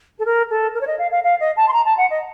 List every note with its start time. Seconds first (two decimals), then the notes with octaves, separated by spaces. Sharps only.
0.18 A4
0.25 A#4
0.50 A4
0.74 A#4
0.80 C#5
0.86 D#5
0.98 F5
1.11 F5
1.23 F5
1.39 D#5
1.56 A5
1.68 C6
1.72 A#5
1.85 A5
1.97 F#5
2.09 D#5